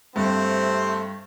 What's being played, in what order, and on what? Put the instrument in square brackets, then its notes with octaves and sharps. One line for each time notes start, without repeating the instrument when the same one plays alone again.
[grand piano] G2 [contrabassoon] C3 [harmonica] A3 C4 C5